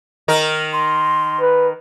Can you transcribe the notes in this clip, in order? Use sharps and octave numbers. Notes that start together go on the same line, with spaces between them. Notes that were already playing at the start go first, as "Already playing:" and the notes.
D#3 D#4 A#4
C6
B4